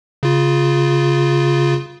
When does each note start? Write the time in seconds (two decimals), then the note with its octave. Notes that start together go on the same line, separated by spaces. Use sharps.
0.23 C#3 F4